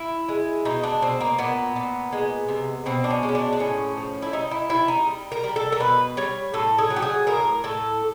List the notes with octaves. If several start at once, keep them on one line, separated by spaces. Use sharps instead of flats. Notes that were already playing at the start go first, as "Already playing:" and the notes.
Already playing: E4
G#3
B2 D#4
D4
B2 C4
A#3
A#2 B3
A#2
G#3
C3
B2 C4
D4
C#4
G#3
C#4
D4
D4
A2 C#4
F3
E4
G3 D#4
E4
C3 E4
D#4
G3
A#4
G3
A4
A#4
B2 B4
G3 C#5
A2 A4
G#4
F#3
G4
G#4
A2 A#4
A2 A4